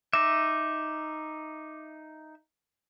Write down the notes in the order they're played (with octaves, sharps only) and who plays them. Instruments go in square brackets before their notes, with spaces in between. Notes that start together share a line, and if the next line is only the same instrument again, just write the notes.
[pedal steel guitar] D#4 E5 [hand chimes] D6